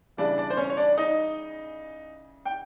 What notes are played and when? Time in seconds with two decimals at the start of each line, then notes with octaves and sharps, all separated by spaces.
0.17 C#3 E3 G3 D4 D5
0.38 D4 D5
0.50 C5
0.57 C#4 C#5
0.70 C#5
0.77 D4 D5
0.97 D#4 D#5
2.45 G5